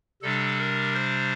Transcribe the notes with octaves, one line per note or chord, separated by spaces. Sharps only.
C3 G3 D4 A4
A#4
C5